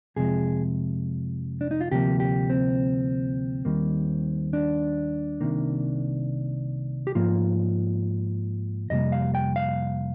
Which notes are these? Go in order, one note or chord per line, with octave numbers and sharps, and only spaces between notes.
F2 C3 F3 G#3 G#4
D4
D#4
F4
D2 C3 F3 A#3 G4
G4
C4
D#2 D#3 G3 A#3
D4
C2 C3 D#3 A#3
G4
G#2 F3 A#3 F4
F2 C3 G3 A#3 D#5
F5
G5
F5